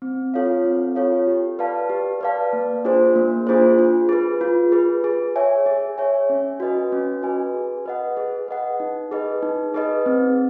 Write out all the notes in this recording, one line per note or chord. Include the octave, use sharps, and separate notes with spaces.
C4
F4 A4 C#5 F5
C4
F4 A4 C#5 F5
G4
B4 D5 F5 A5
G4
B4 D5 F5 A5
A#3
D4 F4 G#4 C5
A#3
D4 F4 G#4 C5
F4
G#4 B4
F4
G#4 B4
G#4
C#5 E5 G#5
G#4
C#5 E5 G#5
C#4
F#4 B4 D#5 G#5
C#4
F#4 B4 D#5 G#5
G#4
B4 D#5 F#5
G#4
B4 D#5 F#5
D#4
G#4 B4 D#5
D#4
G#4 B4 D#5
C4